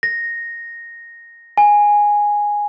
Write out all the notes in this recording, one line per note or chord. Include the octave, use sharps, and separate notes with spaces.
A#6
G#5